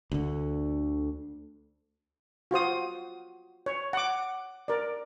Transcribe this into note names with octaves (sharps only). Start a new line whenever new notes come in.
D2 D3
F4 F#4 C5 D#6
C#5
F#5 D6
A#4 D5